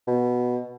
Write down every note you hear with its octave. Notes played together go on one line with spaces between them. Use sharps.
B2